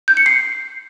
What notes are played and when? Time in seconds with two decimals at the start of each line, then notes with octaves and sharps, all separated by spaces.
0.08 G6
0.17 C#7
0.26 C7